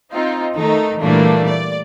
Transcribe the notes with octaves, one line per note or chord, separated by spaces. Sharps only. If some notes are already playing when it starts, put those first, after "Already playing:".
C4 D#4 F4
D#3 A3 D#4 A4
A#2 E3 G3 A3 A#3 D4
D5